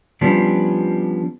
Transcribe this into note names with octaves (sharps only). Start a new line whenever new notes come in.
F3 G3 B3 C#4 D4